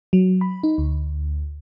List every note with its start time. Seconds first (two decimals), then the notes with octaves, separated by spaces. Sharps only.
0.13 F#3
0.41 B5
0.63 D#4
0.78 D2